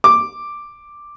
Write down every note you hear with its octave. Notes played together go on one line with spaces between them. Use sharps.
D6